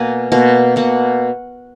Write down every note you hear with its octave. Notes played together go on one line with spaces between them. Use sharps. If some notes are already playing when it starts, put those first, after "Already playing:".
Already playing: B2 A#3 F#5 G#5
B2 A#3
B2 A#3 F#5